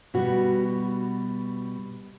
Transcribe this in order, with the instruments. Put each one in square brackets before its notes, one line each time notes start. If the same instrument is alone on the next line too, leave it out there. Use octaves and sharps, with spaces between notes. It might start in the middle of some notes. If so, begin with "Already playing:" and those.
[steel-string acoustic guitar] B2 G3 F#4